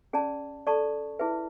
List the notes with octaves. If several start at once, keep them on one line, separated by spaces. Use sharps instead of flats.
C#4 G#4 D5 A5
A4 D5 A5 C#6
E4 G#4 B4 E5